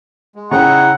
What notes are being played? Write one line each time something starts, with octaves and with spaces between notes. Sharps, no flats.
G#3
C#3 D#4 E4 F#5 G5 A#5 C#6